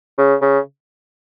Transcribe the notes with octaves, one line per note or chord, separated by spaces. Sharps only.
C#3
C#3